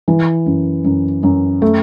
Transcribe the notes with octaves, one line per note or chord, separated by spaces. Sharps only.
E3
F#2
F#2
F#2
A3